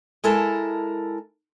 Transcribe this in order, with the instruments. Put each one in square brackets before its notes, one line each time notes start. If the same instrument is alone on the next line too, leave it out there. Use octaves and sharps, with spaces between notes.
[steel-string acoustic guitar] G#3 E4 A4 A#4 A5